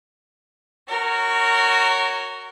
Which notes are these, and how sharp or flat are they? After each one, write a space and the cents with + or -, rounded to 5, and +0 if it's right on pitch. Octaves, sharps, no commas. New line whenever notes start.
F#4 +10 A#4 -20 C#5 +0